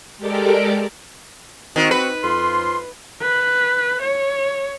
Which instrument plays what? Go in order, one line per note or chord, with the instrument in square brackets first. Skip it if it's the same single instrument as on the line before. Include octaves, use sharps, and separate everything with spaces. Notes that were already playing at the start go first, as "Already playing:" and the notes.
[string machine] G#3 G4 A4 A#4 D5 D6
[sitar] D#3 [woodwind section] C4 F#4
[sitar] B4
[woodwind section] F2 F4 C6
[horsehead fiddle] B4
C#5